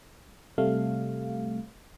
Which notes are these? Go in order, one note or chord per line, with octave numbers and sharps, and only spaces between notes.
C3 G3 A3 F5